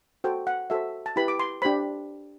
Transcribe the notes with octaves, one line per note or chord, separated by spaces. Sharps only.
F#4 A4 C5 G5
F#5
F#4 A4 C5 E5
A5
E4 G4 B4 B5
D6
C6
D4 G4 C5 B5